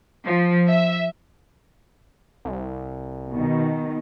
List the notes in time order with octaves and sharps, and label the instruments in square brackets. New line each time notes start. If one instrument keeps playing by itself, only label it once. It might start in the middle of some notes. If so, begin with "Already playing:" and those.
[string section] F3
E5
[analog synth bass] C2
[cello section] B2 D#3